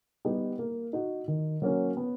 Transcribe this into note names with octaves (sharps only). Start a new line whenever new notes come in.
G3 B3 D#4 G4
A#3
D#4 F#4
D#3
F#3 A#3 C#4 F#4
B3